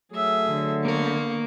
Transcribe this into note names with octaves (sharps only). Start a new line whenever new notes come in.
F#3 A3 G#4 E5
D3
A#3 B3 A#4 C#6